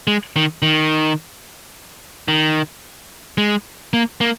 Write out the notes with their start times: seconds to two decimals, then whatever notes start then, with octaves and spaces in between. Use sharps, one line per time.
0.07 G#3
0.36 D#3
0.62 D#3
2.28 D#3
3.38 G#3
3.93 A#3
4.21 A#3